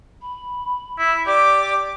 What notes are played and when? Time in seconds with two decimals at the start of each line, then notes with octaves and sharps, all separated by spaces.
0.22 B5
0.98 E4 B6
1.26 G4 D5 D6